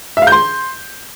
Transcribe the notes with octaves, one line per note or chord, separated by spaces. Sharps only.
E5
F5
G6
C6